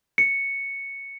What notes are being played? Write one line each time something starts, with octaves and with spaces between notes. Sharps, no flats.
C#7